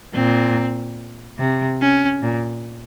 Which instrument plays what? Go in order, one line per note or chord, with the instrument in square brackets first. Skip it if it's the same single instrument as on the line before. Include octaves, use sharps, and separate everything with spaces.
[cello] A#2 [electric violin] C4
[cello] C3
[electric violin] C#4
[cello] A#2